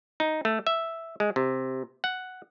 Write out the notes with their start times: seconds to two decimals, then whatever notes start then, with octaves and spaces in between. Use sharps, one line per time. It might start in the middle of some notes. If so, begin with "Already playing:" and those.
0.20 D#4
0.45 A3
0.67 E5
1.20 G#3
1.36 C3
2.04 F#5